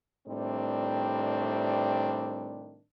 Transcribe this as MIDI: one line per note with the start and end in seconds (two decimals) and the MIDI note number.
0.27 2.81 45
0.27 2.81 48
0.27 2.81 51
0.27 2.81 55
0.27 2.81 60
0.27 2.81 62